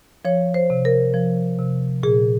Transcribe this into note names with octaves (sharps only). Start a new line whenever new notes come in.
F3 C#5
C5
C3
A#4
F3
C3
A#2 G#4